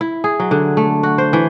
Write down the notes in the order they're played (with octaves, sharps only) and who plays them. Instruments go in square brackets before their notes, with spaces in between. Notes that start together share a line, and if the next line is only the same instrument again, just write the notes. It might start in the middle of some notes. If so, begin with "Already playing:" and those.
[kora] E4
G#4
F#3
D3
A3
F#4
C5
E3